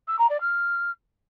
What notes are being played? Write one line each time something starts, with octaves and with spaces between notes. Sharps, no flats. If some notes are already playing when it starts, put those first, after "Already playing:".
E6
A#5
D5
F6